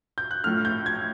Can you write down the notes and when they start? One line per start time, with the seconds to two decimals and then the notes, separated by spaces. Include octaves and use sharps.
0.18 G6
0.31 F#6
0.44 A2 F3 A3 F6
0.65 G6
0.86 G#6